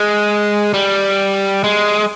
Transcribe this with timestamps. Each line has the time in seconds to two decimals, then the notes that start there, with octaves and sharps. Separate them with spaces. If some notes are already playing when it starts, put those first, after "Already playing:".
Already playing: G#3
0.74 G3
1.64 G#3